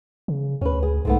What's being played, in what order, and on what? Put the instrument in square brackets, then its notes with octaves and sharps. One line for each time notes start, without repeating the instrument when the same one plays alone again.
[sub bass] C#3
[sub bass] D2 [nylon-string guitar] C#4 B4
[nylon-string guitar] G#4
[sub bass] B1 [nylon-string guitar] G#2 A3 B3